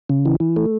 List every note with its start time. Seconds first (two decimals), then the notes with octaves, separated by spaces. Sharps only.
0.10 C#3
0.26 E3
0.40 E3
0.56 A3